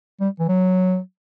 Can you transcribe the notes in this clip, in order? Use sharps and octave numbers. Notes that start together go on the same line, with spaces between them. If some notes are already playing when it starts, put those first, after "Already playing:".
G3
E3
F#3